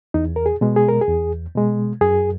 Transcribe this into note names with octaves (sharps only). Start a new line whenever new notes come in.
E2 D#4
A#4
G#4
B2 G#3
G#4
A#4
G#4
E2
B2 G#3
F#2 G#4